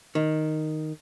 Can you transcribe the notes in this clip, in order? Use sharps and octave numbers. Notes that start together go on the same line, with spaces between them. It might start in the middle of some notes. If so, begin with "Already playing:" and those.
D#3